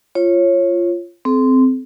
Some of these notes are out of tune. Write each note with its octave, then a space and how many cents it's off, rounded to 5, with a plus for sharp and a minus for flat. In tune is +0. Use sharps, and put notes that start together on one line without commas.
F4 -15 C#5 -20
C4 -15 A4 -45